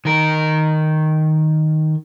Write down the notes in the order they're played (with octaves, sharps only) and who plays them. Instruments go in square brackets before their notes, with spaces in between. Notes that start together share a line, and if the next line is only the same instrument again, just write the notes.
[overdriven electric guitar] D#3 A#4